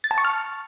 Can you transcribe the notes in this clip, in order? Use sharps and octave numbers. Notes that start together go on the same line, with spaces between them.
A6
A5
C#6
F6